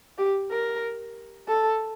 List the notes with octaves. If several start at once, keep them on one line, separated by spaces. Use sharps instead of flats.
G4
A#4
A4